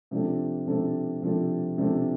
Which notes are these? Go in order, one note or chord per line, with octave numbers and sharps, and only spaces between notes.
C3 F3 D4 A4
C3 F3 D4 A4
C3 F3 D4 A4
C3 F3 D4 A4